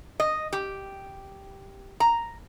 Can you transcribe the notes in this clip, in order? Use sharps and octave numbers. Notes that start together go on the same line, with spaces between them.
D#5
G4
A#5